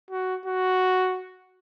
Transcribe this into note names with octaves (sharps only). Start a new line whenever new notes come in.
F#4
F#4